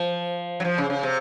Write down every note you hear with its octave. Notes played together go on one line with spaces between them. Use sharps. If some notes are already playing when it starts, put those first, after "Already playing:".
Already playing: F3
F#3
F3
C#3
C#3
C3